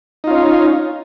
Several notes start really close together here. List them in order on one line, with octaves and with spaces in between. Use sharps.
D#4 F4 C#4